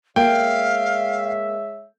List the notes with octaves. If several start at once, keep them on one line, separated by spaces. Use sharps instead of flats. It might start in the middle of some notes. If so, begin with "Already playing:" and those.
G#3 A#3 C#5 E5 F5 G5